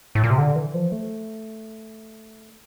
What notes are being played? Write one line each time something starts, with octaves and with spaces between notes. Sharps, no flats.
A2
A#2
C3
D3
E3
F3
A3